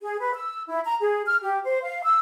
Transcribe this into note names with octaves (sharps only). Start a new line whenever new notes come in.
G#4
B4
E6
E4
A#5
G#4
F6
G4
C5
F5
E6